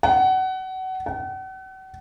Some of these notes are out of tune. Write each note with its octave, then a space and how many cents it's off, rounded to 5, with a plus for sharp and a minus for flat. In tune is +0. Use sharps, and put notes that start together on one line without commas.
F#5 +25
F#5 +40